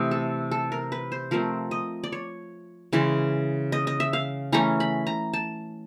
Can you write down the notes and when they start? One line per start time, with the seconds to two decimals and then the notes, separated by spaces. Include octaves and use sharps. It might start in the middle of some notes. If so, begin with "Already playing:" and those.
Already playing: C3 E3 A3 D#5
0.11 A4
0.51 A4
0.72 A#4
0.92 B4
1.12 C5
1.31 F3 A3 C4 A#4
1.71 D#5
2.04 D5
2.12 C#5
2.93 C#3 E3 G#3
3.72 D#5
3.87 D#5
4.00 E5
4.13 F5
4.52 E3 A3 C#4 A#5
4.80 B5
5.07 A#5
5.33 A5